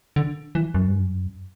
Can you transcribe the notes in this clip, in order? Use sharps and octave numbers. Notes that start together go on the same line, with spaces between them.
D3
E3
F#2
G2
F#2